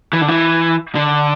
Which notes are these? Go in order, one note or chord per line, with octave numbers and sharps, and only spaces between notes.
E3
D3
E3
D3